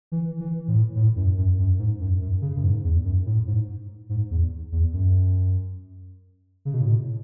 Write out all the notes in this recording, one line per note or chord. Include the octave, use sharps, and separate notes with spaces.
E3
E3
A2
A2
F#2
F#2
F#2
G#2
F#2
F#2
C#3
F#2
G#2
E2
F#2
A2
G#2
G#2
E2
E2
F#2
C#3
B2
A2